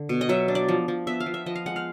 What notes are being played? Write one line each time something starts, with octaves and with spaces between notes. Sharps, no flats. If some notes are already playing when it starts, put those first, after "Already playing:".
Already playing: D3
B2
D#5
F#3 E5
D4
D5
F3
F3
B3 E5
F5
F3
E5
F3 D#5
F5
G#3 F#5
F5